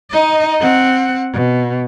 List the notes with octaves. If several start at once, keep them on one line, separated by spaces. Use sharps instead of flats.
D#4 D#5
C4 F#5
B2